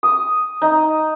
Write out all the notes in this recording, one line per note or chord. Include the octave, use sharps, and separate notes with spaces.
D#6
D#4